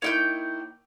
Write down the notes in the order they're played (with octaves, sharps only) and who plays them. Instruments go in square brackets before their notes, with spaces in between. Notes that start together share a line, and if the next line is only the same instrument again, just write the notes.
[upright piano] A#3 D#4 E4 [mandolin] C#5 G5 G6